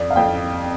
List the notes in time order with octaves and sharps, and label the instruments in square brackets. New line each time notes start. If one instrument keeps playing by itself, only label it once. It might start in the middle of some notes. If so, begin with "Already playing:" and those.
Already playing: [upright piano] F2 [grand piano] D5
[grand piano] F5
[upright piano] F2 [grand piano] G5